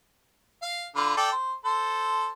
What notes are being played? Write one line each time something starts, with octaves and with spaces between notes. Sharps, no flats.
F5
D3 F4 B4
A4 D5 G5
C5
A4 C5